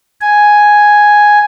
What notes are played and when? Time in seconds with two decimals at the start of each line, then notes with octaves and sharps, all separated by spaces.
0.21 G#5